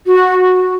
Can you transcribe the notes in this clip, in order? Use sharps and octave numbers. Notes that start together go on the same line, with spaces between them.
F#4